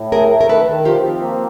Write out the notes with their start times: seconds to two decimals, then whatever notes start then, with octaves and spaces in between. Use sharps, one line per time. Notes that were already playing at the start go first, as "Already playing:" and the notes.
Already playing: A2
0.12 A3 G#4 A#4
0.30 A3
0.41 A#4
0.49 D#3 A4 B4
0.67 D#3
0.85 F3 F4 G4
1.05 C4
1.22 A#3